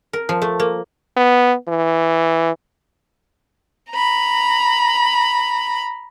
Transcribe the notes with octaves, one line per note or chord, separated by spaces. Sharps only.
A#4
F3
A3
A#3
B3
E3
A#5 B5